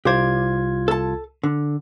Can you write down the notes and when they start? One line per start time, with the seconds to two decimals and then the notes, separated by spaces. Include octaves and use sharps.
0.05 C2 F4 G4 C5 D5 G#6
0.88 A4 A5
1.44 D3